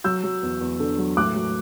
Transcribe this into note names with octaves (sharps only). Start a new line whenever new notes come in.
F#3 E6 G6
F#3
E2
E2
D3
F#3
A2 D6 F#6
F#3